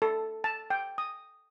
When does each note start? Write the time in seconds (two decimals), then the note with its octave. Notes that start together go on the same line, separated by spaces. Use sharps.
0.02 A4
0.44 A5
0.70 G5
0.98 D#6